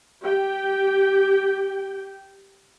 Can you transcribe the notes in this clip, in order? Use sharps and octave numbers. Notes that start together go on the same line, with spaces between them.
G4 G5